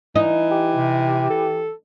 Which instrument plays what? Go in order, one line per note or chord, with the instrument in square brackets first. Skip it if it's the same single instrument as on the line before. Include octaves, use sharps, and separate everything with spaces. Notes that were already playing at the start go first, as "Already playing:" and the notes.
[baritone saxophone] E3 [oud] D#4
[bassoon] G4
[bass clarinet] C3
A4